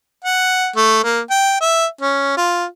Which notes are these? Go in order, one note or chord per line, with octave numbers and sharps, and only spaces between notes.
F#5
A3
A#3
G5
E5
C#4
F4